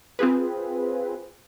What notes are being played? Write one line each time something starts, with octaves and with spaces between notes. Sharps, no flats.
C4 F4 G#4 B4